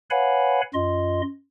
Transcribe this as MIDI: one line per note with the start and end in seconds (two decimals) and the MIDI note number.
0.10 0.61 71
0.10 0.61 73
0.10 0.61 77
0.10 0.61 78
0.10 0.61 80
0.10 0.61 83
0.74 1.22 42
0.74 1.22 65
0.74 1.22 75
0.74 1.22 84